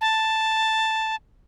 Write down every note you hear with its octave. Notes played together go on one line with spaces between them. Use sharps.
A5